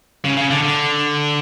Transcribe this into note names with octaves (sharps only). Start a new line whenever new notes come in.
C#3
C#3
D3
D3